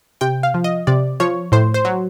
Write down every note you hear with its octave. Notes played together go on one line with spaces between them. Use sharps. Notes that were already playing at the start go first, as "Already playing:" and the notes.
C3 G5
F5
F3
D#5
C3 D5
F3 C#5
A2 C5
C5
F#3